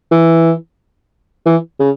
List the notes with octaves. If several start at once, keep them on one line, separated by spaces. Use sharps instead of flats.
E3
E3
C#3